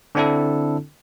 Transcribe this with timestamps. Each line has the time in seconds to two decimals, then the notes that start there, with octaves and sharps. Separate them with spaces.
0.15 D3 C4 D4 E4 A4